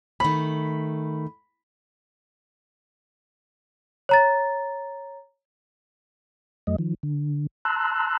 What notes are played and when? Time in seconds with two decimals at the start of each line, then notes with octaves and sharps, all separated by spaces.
0.20 D#3 A3 B5
4.09 C#5 A#5 A6
6.67 F2 F#3 A3 D#5
6.79 D#3 F3
7.03 D3
7.65 A5 A#5 C6 E6 F#6